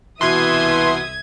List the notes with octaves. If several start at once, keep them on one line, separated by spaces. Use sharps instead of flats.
C2 B2 E3 E5 C6 D#6 G#6